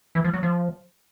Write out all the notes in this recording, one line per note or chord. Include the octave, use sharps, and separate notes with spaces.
E3
F3
F#3
F3